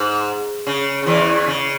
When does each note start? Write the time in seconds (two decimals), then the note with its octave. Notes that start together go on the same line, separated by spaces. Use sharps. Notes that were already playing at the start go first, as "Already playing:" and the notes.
Already playing: G#2
0.67 C#3
1.02 C#3
1.06 E2 E3
1.47 C#3